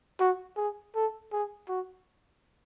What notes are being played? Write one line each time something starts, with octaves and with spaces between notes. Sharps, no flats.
F#4
G#4
A4
G#4
F#4